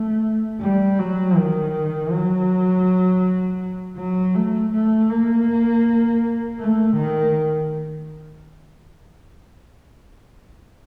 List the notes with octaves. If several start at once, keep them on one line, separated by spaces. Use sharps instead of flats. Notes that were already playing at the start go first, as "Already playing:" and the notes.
Already playing: A3
G3
F#3
D#3
F#3
F#3
A3
A3
A#3
A3
D#3